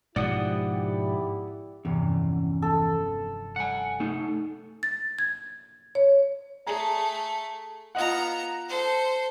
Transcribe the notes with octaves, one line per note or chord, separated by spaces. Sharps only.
G#2 B2 F3 E4 G4 D5 F#5 D#6
F1 E2 G2 C#4
A4
G3 F#5 G#5 C#7
A3 B3 D#4 F#5
A6
G#6
C#5
A3 G#4 A#5
B3 F4 D#5 F#5 A#5
A4 C5